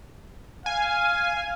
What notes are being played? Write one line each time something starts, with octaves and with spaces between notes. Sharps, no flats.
F5 G#5